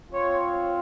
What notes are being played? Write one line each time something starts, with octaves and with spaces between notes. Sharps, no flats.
C4 F4 C#5